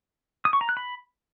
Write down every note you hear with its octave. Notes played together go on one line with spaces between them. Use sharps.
D#6
C#6
A#5
F#6
B5